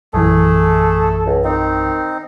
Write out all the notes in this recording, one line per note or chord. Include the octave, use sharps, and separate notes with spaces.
A#1 F#2 E3 A3 G#4 A4
C#2
D#3 C4 D#4